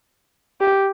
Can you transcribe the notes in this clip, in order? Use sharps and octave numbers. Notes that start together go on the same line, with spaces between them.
G4